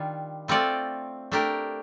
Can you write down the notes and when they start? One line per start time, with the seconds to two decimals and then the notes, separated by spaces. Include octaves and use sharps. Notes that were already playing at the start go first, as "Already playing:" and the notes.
Already playing: D#3 G3 D4 F4
0.48 A3 C4 F4 A4 D5
1.32 A3 D4 G4 A#4